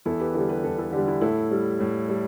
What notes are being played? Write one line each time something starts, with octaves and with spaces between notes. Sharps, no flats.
E2 E4 A4
G4 B4
D3 G3 E4 A4
G4 B4
E2 E4 A4
E4 A4
D3 G3 D4 G4
E4
A2 E4 A4
G3
A2
G3